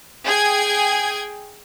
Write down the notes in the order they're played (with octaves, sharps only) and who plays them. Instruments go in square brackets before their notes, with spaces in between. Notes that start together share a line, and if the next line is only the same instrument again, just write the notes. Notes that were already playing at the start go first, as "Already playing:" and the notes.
[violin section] G#4 G5 G#6